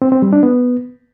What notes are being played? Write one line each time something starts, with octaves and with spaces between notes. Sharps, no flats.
C4
C4
G3
D4
B3